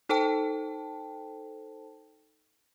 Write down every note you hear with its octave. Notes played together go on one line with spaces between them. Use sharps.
D#4 A4 C5 G5 A5